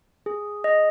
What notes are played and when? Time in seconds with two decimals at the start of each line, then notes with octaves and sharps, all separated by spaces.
0.26 G#4
0.64 D#5